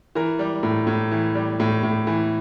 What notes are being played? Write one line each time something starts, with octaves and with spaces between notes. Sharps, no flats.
E3 A#4
G3
A2
A2
E3
G3
A2
A2
E3